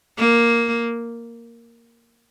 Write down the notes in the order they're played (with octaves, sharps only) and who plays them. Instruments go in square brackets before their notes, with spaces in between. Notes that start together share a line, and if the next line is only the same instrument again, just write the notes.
[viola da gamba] A#3